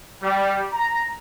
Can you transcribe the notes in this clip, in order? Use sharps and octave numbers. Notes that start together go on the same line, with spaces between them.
G3
A#5